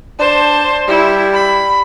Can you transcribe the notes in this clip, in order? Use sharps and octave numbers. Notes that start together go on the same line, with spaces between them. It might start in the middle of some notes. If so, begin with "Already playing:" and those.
D4 C5 A5
G3 E4
B5